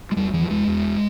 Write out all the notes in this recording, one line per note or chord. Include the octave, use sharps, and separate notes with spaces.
G#3
E2 G3
E2 E3
F3
E2 G#3
E2